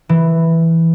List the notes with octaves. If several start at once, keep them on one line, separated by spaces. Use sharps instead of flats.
E3